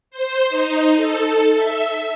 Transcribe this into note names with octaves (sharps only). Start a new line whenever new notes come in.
C5
D#4
A4
E5